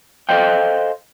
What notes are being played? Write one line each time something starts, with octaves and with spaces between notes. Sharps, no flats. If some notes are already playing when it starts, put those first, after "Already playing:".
A4 C5 D#5 F5 G5